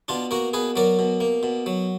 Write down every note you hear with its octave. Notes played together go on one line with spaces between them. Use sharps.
B2 D4 F4
A#3 F#4 A#4
B2 G#4 B4
F#3 A#4 D5
B2
A#3
B2
F#3